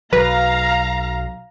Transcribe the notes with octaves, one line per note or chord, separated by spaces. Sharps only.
B1 F#3 B4 F5 A#5